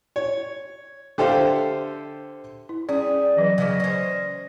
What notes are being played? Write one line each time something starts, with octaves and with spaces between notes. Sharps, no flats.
C#5
D3 G4 A4 C5 E5 F5
E4
G3 C#4 G#4 D5
E3 F#3 B4 D#5
F#2 C#3 D6
C#4 C5 D5